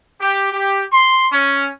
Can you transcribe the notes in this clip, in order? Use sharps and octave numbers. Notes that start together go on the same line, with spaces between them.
G4
G4
C6
C#4